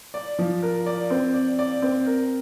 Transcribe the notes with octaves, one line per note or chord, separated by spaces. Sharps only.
D5
F3
A#4
D5
C4
D5
D5
C4
A#4